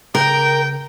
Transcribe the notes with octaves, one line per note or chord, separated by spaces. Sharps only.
C#3 A#4 G5